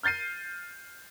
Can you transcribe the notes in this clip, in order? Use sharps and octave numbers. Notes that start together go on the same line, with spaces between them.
F6 G6 A6 C7 D#7